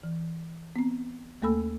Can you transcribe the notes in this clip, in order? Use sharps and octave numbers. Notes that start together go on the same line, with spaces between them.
E3
B3 C4
D#2 A3 A#3 A4 B5 E6